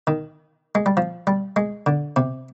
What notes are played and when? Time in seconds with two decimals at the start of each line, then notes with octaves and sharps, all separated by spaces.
0.07 D#3
0.75 G#3
0.86 G3
0.97 F3
1.27 G3
1.56 G#3
1.86 D3
2.16 C3